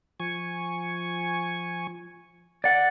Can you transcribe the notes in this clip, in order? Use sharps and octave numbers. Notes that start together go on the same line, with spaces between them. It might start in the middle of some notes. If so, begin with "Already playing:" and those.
F3 G#5 C#6
D5 F#5